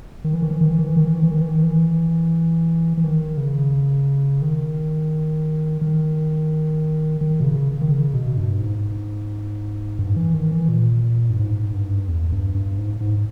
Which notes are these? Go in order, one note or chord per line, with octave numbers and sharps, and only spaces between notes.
D#3
E3
D#3
E3
D#3
E3
D#3
E3
D#3
E3
D#3
E3
D#3
E3
D#3
E3
E3
D#3
C#3
D#3
D#3
D#3
B2
C#3
D#3
C#3
B2
G2
G#2
G2
E3
D#3
E3
A#2
G2
G#2
G2
E2
G2
G2
G#2
G#2